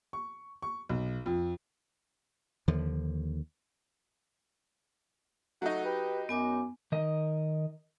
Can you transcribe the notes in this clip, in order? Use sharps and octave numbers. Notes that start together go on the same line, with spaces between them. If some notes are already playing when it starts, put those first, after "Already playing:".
C#6
C#6
B1
F2
D#2 D3 F3
F#3 A3 D#4 F#4
G4 B4
F#2 B3 G#5 D6
D#3 A#4 D#5